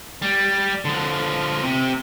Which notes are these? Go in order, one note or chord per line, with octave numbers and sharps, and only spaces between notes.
G3
D3 F3
C3